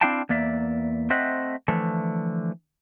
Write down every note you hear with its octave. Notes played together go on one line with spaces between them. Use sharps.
C4 D4 E4 F5 G5 A5
E2 A#3 D5 E5
A3 C4 C5 D#5 E5 F#5
D3 E3 F3 A3